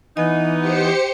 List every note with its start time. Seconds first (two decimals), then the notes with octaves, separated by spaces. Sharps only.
0.17 E3 B3 D#4 D#5 G#5
0.60 G4 C5 C#7